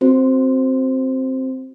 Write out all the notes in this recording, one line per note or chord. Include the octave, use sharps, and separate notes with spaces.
C4 F#4 C5